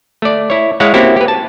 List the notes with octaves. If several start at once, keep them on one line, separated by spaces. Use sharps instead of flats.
A3 D5
E4 C#5
G#3 E4 C#5 F5 F#5
A#3 C4 C#4 E4 F#4 G4
G4 B4
A5